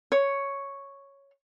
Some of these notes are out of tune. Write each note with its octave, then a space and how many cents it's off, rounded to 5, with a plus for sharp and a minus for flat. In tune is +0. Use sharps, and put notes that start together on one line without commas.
C#5 +0